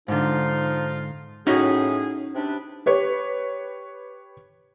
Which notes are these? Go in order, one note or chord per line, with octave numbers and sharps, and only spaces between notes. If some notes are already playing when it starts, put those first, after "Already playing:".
G#2 D3 F3 D#4 F4
A2 C#4 D#4 F#4 G#4
C3 D4 B4
G4 B4 C#5